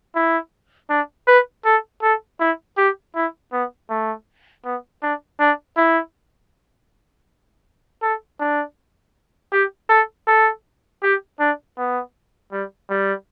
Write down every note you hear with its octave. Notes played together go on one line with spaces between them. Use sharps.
E4
D4
B4
A4
A4
E4
G4
E4
B3
A3
B3
D4
D4
E4
A4
D4
G4
A4
A4
G4
D4
B3
G3
G3